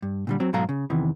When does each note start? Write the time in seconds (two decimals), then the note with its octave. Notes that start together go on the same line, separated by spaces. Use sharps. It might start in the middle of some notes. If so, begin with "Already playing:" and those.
0.02 G2
0.27 A#2 D3 G3
0.40 F#3 C4
0.53 G#2 B2 F#3 A4 F5 A#5
0.69 C#3
0.90 E2 C3 D#3 E3